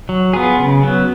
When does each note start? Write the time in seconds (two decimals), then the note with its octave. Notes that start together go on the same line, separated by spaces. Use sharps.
0.09 F#3
0.33 B3 F4 G#4
0.59 C#3
0.83 F#3 B3